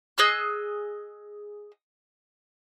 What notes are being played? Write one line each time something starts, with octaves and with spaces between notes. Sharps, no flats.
G#4 D#5 E6 F#6